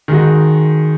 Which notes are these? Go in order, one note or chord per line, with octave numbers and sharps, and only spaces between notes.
D#3 G#3 D#4 F#4